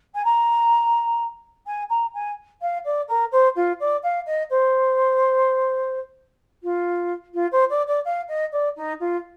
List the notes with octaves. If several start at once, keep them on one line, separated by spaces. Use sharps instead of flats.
G#5
A#5
G#5
A#5
G#5
F5
D5
A#4
C5
F4
D5
F5
D#5
C5
F4
F4
C5
D5
D5
F5
D#5
D5
D#4
F4